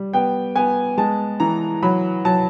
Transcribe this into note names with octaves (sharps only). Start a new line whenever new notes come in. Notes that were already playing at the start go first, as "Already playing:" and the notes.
Already playing: G3
B3 G5
B3 G#5
G#3 A5
E3 A#5
F#3 B5
F#3 A5